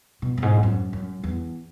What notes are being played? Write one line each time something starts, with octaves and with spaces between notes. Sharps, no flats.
B2
F#2
G#2
E2
F#2
F#2
E2